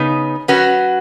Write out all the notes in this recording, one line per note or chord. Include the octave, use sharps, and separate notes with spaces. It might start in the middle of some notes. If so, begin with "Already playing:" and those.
Already playing: C#3 B3 D#4
F#3 C#4 F#4 B4